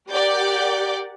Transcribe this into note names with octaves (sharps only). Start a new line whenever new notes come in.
G4 A#4 D5 F#5 D6 G6